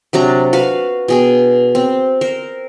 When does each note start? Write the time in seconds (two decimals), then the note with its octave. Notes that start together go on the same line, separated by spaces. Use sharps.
0.13 C3 F#3 D4 A#5
0.53 F#4 B4 F5
1.08 B2 G#4 G5
1.75 C4
2.21 A#4 C5